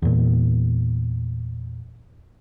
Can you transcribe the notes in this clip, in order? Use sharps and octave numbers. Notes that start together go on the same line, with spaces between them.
E2 A#2